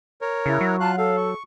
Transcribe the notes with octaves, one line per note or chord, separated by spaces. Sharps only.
A#4 C#5
C#3 E4
F#3
F4 F5 A5 F#6
A4 F5
C#6